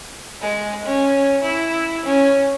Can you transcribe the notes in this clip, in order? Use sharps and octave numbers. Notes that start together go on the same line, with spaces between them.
G#3
C#4
E4
C#4